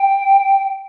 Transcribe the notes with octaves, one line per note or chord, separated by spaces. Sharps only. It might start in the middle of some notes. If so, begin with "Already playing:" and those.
Already playing: G5